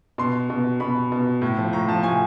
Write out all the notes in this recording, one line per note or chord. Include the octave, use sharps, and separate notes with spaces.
B2 C6
B2
B2 B5
B2
A2
F3
A2 A#5
F3 A5
A2 G#5